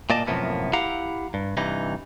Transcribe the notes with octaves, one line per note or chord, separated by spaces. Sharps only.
A#2 A#3 D5 D#5 A5
F#2 A2 C3 F3 A#3 B3
E4 G4 F5 F#5 A#5
G2
G2 C3 E3 D#4